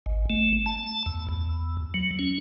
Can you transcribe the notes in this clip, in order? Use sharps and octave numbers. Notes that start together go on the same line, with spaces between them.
G#1
A3
A5
E2
E2
F#3
C#4